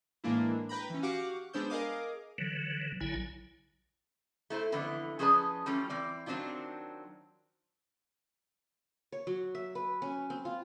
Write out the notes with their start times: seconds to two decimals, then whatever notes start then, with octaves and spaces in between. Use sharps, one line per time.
0.24 A2 E3 G#3 A#3 D4 E4
0.69 B4 G5 A#5 B5
0.90 E3 C#4
1.02 F#4 G4 F5 F#5 C#6 D6
1.53 G#3 B3 D4 C5 E6 G6
1.70 G#4 A#4 D#5 F5 D6 D#6
2.38 D3 E3 F#3
3.00 A#1 D3 F#3 E4 G#5
4.50 A3 E4 B4 C5
4.72 F2 D3 E3 B3 E4
5.19 F3 C#4 G#4 B4 D5 A5
5.66 E3 G3 A3 C#4 F4
5.90 E3 C4 D5
6.26 D#3 F#3 C4 D4 E4 F4
9.12 C#5
9.27 F#3
9.55 E5
9.75 B4
10.02 C#4
10.30 C4
10.45 F4